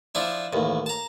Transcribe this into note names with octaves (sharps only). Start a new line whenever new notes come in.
F3 D4 E4
A1 D#2
A5 A#5